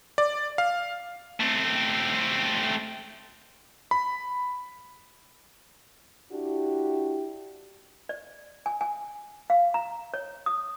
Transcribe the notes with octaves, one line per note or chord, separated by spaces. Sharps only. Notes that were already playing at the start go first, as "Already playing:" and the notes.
D5
F5
A3 C4
B5
D4 E4 F#4 G4
D5
G#5
G#5
F5
A#5
C#5
D#6